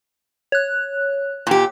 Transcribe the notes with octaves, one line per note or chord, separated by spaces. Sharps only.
C#5 F#6
A#2 G4